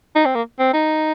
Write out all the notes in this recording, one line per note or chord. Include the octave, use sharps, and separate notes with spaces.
D#4
C4
A#3
C4
D#4